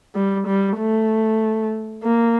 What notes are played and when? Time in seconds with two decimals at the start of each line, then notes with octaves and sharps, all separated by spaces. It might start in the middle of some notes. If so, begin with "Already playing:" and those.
0.15 G3
0.47 G3
0.78 A3
2.03 A#3